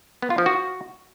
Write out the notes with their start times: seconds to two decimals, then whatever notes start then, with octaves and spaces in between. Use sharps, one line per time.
0.22 B3
0.30 F4
0.38 F3
0.46 F#4